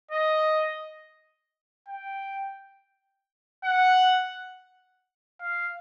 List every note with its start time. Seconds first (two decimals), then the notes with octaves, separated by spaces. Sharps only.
0.12 D#5
1.89 G5
3.64 F#5
5.41 F5